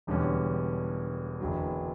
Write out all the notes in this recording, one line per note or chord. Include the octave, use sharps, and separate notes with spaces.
E1 E2 D3 G3 C#4
F#1 E2 D3 F#3